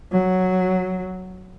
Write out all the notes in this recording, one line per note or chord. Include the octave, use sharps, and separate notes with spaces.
F#3